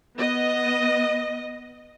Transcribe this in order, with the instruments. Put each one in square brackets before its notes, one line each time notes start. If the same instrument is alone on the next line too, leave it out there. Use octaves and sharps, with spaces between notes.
[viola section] B3 D#5